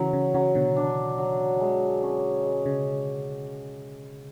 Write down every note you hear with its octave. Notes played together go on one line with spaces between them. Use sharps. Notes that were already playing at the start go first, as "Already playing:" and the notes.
Already playing: C#3 E3 F#3
C#3
C#3 F#3
B2 D3
D4
F#3
G#3
C#4
G#3
C#3